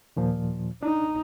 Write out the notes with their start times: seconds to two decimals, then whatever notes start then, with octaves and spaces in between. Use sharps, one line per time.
0.16 D#2 A#2 F3
0.83 D4 D#4